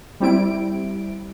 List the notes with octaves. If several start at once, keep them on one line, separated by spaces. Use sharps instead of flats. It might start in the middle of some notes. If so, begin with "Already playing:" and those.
G3 C4 E4 D7